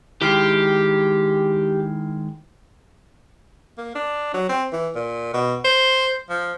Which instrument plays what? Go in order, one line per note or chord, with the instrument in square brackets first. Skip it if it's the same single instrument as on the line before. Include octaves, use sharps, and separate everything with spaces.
[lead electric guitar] D#3 G#3 [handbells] E4 F6 C7 [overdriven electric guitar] G4
[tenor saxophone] A#3
D4
F#3
C4
E3
A#2
B2
C5
F3